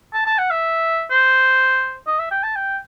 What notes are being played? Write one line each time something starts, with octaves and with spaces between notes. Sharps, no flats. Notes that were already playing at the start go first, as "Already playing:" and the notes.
A5
A5
F#5
E5
C5
D#5
E5
G5
A5
G5